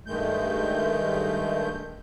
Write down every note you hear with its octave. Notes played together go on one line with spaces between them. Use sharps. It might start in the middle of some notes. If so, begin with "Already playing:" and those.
G2 D#3 G#3 A3 G6